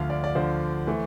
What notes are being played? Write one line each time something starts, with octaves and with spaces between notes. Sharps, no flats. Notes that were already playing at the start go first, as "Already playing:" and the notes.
Already playing: D2 D3 F3 F5
D5
D5
D2 D3 F3 C5
E3 A3